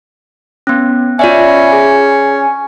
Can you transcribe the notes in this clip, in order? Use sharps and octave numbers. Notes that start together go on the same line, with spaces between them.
B3 C#4
C#4 F4 D5 E5
G#4